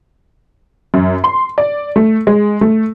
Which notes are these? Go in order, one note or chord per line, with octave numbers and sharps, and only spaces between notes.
F#2
C6
D5
A3
G#3
A3